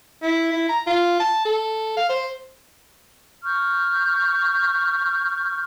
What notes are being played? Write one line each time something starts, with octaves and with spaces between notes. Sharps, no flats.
E4
E4
A#5
F4
A5
A4
F5
C5
C#6 F6 G6